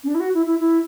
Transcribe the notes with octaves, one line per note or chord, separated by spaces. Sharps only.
C#4
D4
E4
F#4
E4
E4
E4